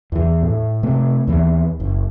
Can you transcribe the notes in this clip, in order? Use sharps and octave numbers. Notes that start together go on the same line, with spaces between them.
E2 E3
A2
C3 A3
D#2 E3
F#1